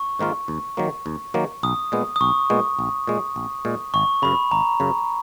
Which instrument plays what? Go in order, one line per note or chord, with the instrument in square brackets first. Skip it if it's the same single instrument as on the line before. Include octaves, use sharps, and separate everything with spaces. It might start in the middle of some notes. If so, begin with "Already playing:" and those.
Already playing: [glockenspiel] C#6
[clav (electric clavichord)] G#2 D#3 A#3 F4
D#2
D#3 F#3 A#3
D#2
D#3 F#3 A#3
[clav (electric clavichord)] B1 [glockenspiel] D#6
[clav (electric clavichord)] A#2 G#3 B3
[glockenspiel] D#6
[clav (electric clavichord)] B1 [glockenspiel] C#6
[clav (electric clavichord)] A#2 G#3 B3
A#1
A#2 G#3
A#1
A#2 G#3
[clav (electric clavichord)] G#1 [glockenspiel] C#6
[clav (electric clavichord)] F#2 C#3 [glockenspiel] B5
[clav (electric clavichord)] G#1 [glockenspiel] A#5
[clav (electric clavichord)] F#2 C#3